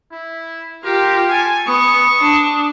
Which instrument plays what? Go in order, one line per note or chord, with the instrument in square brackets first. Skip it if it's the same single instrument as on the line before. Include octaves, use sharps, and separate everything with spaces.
[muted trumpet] E4
[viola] F4 G4 [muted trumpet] A#4
[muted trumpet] A4 [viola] G#5
[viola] B3 [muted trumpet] C#6 [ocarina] D#6
[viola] D4